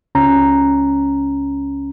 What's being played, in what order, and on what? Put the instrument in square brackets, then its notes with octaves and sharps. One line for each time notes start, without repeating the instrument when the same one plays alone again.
[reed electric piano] C#2 C#4 A#5